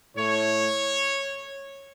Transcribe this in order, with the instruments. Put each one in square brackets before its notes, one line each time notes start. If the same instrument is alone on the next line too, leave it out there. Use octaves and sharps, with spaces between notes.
[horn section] A2 A3 C#5